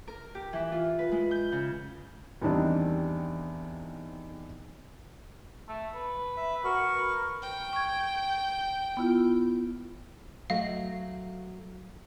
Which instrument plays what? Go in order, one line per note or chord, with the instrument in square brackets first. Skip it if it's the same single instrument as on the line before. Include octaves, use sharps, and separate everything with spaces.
[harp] A#4
G4
E3
F4
B4
G#3
G6
C#3
[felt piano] E2 D#3 G3 C4 D4 D#4
[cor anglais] A3
B4
[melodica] E5
[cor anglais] F#4 [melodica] A#4 C#6
[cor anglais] B4
[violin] G5
[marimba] C#6 G#6
B3 E4 F4
[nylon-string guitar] F#3 A3 [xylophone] D#5 F5